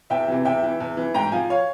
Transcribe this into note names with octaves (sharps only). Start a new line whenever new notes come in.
E2 E5 G5
C3 E3
E2 E5 G5
E3
E2
E3
G#2 G5 A#5
F3 F5 G#5
C#5 F5